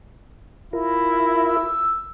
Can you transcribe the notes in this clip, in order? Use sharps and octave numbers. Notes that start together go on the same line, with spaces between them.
E4 F4 A#4
E6